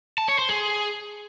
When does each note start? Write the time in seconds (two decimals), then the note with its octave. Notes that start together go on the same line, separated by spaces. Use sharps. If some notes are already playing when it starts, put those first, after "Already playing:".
0.18 A5
0.28 C#5
0.39 C5
0.49 G#4